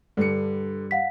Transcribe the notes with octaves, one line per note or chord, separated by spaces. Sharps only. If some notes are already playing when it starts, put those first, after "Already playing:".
G2 D3 G3 C#7
F5 F#5 B6